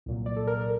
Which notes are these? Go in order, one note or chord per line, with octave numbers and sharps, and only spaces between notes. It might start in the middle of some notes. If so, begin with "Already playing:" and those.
C2 A#2 F#3
D5
A4
A#4
A#4